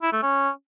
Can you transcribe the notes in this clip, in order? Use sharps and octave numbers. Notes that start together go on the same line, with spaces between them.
E4
A3
C#4